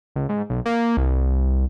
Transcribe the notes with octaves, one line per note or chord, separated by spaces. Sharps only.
C#2
G#2
B1
A#3
C2